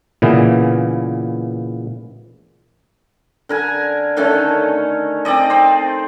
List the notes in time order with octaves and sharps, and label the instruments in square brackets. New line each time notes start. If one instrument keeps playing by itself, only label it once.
[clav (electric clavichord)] A#2 C#3 E3 B3
[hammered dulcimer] D3 A#4 G#5
D3 D#3 A3 C#4
C4 D#4 D5 D#5
C4 C5